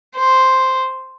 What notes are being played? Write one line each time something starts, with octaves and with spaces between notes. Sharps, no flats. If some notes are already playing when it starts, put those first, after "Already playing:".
C5